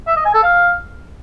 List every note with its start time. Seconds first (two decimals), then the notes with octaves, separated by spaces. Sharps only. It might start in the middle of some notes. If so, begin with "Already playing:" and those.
0.08 E5
0.16 D#5
0.25 G#5
0.34 A4
0.43 F5